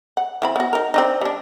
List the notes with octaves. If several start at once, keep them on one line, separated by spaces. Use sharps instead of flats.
F#5
E3 C4 B5
B3 F#4
D#4 A#4
C4 D4 D#4
G3 D4